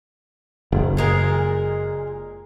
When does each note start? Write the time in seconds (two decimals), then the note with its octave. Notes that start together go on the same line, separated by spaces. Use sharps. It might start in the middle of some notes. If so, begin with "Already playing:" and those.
0.72 F#1
0.97 A#2 G#3 A#4